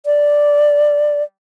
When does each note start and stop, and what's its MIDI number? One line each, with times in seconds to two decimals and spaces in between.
0.06 1.23 74